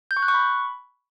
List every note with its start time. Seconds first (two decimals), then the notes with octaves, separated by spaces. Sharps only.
0.11 G6
0.17 C#6
0.22 F#6
0.28 C#6
0.34 B5